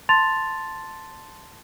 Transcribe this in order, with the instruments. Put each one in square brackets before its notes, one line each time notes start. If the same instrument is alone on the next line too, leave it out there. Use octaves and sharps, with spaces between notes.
[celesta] A5 C6 A6 F7